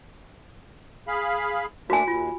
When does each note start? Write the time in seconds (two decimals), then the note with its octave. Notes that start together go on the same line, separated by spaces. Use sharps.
1.08 G#4 F5 B5
1.90 A3 A#3 D4 F#4 G#5
2.08 D#2 F4